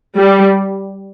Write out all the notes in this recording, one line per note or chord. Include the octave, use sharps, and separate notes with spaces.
G3